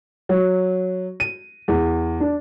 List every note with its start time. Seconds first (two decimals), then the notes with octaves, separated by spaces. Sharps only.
0.29 F#3
1.20 D#7
1.68 E2
2.20 D4